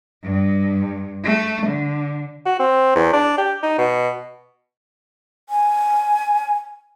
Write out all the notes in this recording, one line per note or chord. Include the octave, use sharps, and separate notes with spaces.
G2
A3
D3
F#4
C4
E2
D4
G4
D#4
B2
G#5